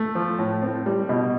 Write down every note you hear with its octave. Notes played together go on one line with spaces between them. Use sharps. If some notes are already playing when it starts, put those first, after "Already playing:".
Already playing: A3
F3
A2
C4
G3
B2